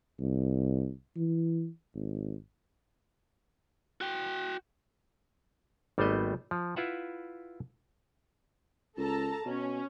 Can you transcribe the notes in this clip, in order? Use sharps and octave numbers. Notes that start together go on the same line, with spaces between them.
C2
E3
G#1
F#4 G5
G#1 G3 A3 B3 C5 D#5
F3
E4 F4 B4 E5 F#5
C#2 A4 A5 A#5
B2 C#4